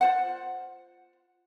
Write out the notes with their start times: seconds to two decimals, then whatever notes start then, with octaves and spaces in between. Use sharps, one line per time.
0.01 F4 C5 F#5